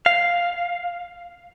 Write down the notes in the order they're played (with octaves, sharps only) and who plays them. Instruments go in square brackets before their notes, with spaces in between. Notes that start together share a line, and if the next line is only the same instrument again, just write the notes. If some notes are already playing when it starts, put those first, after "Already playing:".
[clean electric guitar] F5